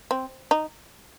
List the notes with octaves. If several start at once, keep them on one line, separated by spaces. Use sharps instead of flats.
C4
D#4